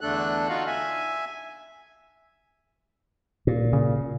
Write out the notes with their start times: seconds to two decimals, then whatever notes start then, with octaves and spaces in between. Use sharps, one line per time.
0.01 E2 D3 A3 D4 A4 F#6
0.49 D#4 F4 F#4 F5
0.67 E5 G#5
3.47 A#2
3.73 C#3